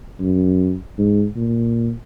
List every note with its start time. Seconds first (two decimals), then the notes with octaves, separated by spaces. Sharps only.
0.20 F#2
0.98 G#2
1.36 A#2